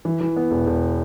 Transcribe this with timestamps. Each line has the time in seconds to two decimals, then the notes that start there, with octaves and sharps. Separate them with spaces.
0.05 E3
0.21 E3
0.36 B3
0.51 E1
0.67 E1